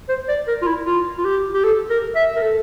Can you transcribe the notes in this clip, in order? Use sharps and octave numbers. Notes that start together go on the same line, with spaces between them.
C5
D5
A#4
F4
E4
F4
F4
G4
G4
A4
A#4
E5
A#4
A4